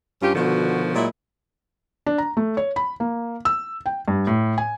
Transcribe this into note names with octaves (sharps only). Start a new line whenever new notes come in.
G2 C#4 F4 G4
B2 D3 D#3 F3 F#4
A#2 F#3 G#3 E4
D4
A#5
A3
C#5
B5
A#3
E6
G5
G2
A2
G#5